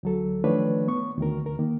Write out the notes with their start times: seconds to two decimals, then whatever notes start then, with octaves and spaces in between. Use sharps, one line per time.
0.03 D2 F#3 A4
0.44 D#3 F3 A3 D4 B4 C#5
0.88 B3 C#6
1.18 D2 D#3 A#4
1.46 D2 A#4
1.59 D#3 A#3